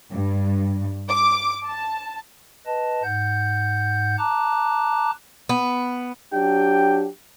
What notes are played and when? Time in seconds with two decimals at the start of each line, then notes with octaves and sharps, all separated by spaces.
0.11 G2
1.09 D6
1.64 A5
2.66 B4 D#5 A5
3.03 G#2 F#5 G6
4.18 A5 A#5 D6 F#6
5.49 B3
6.33 F#3 D4 G4 G5